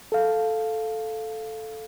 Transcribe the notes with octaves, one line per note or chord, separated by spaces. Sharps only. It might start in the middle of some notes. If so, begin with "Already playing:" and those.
A4 F5